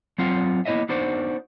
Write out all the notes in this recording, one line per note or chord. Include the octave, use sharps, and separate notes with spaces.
F#3 C4 F4 F#5
A#3 B3 E4 C#5 D#5 E5
B3 D4 D#4 F#4 C5 D5